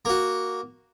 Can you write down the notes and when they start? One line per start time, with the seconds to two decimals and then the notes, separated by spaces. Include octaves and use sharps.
0.05 A#3 F#4